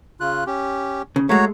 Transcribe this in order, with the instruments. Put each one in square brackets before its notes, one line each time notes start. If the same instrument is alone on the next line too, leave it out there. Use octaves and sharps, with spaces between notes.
[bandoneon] C#3 F4 F#6
C#4 G4
[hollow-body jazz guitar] C#3
[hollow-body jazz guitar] G#3 A3 [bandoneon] F#4 C#5 A#5